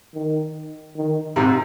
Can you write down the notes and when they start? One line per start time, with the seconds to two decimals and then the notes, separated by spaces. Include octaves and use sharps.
0.14 D#3
0.96 D#3
1.36 G#2 C3